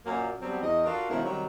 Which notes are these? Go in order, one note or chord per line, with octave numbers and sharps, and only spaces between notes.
F#2 A#2 A#3
D3 F#3 G3 B3 C4
E2 D#5
D4 F4 F#4 A4 A#4
B2 D#3 F3 G#3 C#4 E4
C3 D#3 F#3 G3